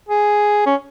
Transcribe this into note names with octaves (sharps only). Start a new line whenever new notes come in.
G#4
C#4